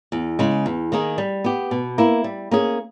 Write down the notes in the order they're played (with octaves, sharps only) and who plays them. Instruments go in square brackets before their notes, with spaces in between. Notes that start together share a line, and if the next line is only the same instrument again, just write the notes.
[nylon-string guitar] E2
C#3 G#3
E2
D#3 A#3 D#4 G#4
G3
B3 G4
B2
A#3 E4
G3
A#3 C#4 G#4